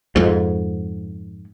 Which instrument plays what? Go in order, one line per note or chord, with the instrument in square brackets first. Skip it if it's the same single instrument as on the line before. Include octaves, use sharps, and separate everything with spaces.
[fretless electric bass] F2 G#2